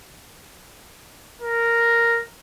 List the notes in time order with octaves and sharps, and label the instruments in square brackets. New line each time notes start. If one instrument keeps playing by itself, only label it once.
[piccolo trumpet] A#4